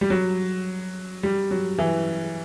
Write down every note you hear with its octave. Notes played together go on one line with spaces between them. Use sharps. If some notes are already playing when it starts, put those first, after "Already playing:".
G3
F#3
G3
F#3
E3